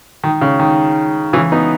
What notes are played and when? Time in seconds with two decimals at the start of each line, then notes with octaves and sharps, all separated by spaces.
0.24 D#3
0.41 C#3
0.60 D#3
1.33 C#3 E3
1.52 B3 D#4